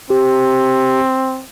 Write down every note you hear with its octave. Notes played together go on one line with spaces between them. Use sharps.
C4 G4